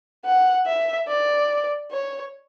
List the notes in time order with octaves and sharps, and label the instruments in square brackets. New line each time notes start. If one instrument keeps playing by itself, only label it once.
[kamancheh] F#5
E5
D5
C#5